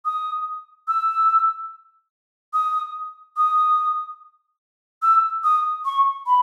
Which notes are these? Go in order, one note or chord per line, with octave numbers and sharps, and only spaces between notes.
D#6
E6
D#6
D#6
E6
D#6
C#6
B5